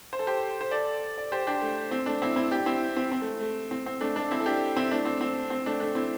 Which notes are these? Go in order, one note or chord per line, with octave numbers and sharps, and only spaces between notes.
C5
A4
G4 C5
C5
A4 D5
D5
G4 C5
D4 G4
A3
C4
A3 D4
C4 E4
C4 E4
D4 G4
C4 E4
C4
C4
A3
A3
C4
C4
A3 D4
A3 D4
C4 E4
A4
D4 G4
C4 E4
A3 D4
C4
C4
C4
A3 D4
A3 D4
C4 E4